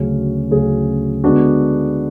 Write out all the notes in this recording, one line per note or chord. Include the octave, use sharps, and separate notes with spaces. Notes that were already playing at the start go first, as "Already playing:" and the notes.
Already playing: D2 C#3 F#3 C#4 G#4
D2 C#3 F#3 C#4 G#4
D3 G#3 B3 D4 F#4